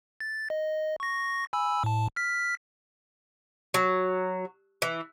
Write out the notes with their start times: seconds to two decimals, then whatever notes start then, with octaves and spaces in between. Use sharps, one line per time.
0.20 A6
0.50 D#5
1.00 C#6 A#6
1.53 G#5 B5 E6
1.84 A2 A5
2.16 F6 B6
3.74 F#3
4.82 E3